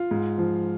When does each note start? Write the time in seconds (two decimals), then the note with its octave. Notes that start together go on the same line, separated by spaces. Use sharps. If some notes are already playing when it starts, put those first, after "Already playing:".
Already playing: F4
0.11 G#2
0.38 F3